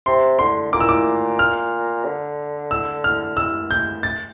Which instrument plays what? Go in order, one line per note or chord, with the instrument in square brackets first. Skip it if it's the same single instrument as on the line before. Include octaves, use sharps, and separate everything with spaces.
[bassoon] C3 [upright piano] C6
[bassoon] D3 [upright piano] C6
[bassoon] A#2 [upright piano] D6
[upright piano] E6
D6
F6
[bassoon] D3
[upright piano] E6
F6
E6
G6
A6